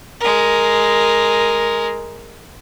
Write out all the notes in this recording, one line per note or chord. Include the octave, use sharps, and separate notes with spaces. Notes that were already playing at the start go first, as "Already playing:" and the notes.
G#3 A#4